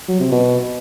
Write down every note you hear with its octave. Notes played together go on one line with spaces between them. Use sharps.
F#3
C3
B2